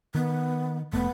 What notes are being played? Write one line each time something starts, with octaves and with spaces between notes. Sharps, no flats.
D#3 B3
F1 A3 B3